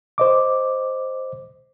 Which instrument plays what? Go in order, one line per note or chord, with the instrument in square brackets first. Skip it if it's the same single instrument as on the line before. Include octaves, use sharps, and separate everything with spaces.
[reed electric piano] C5 D#5 D6